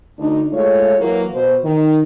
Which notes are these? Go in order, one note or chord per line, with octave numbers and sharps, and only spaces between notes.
D2 D4 D#4
G#3 A3 F4 C#5
E3 F#3 A#3
B2 C5
D#3